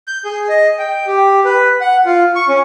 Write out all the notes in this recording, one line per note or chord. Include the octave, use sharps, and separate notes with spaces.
G6
G#4
D#5
G5
G4
B4
F#5
F4
C#6
C#4